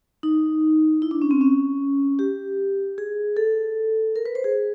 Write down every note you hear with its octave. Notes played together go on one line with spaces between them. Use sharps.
D#4
E4
D4
C#4
C4
C#4
G4
G#4
A4
A#4
B4
C5
G#4